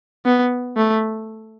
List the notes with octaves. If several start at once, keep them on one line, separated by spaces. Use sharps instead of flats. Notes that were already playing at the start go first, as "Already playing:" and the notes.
B3
A3